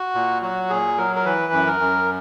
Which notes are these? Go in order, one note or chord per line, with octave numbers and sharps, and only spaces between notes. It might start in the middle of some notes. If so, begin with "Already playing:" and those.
Already playing: F#4
A#2
F#3 F#4
A#2 G#4
F#3 A#4
A#4
E3 B4
F#2
A#4
F#2